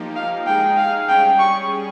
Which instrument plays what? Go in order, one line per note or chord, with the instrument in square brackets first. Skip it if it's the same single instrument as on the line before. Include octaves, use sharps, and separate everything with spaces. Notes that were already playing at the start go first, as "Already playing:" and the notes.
Already playing: [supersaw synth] F3 A#3 D#4 G4
[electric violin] F5
[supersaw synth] G#3 D#4 G#4 [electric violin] G5
[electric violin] F5
[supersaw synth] G3 C#4 G#4 [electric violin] G5
[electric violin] C#6